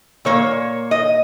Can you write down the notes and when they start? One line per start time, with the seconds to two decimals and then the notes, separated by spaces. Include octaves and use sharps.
0.25 A#2 A#3 C#5
0.91 D#5